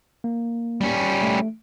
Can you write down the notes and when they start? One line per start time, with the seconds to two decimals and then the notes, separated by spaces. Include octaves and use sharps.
0.24 A#3
0.81 G3 C#4
1.22 A3